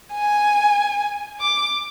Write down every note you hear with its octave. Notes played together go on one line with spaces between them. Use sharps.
G#5
D6